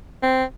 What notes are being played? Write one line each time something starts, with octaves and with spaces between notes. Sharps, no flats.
C4